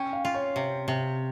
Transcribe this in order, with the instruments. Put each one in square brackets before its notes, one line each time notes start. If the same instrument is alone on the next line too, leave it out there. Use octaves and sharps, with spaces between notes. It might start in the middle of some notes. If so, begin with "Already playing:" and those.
Already playing: [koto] C#4 [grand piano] G5
[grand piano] F5
[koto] F4
[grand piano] C#5
[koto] C3
C3